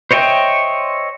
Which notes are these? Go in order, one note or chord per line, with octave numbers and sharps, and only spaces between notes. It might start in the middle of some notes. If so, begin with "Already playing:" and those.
C5 C#5 D#5 E5 G5